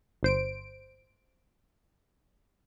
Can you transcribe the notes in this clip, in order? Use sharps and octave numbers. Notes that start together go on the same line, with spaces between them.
G1 C5 D7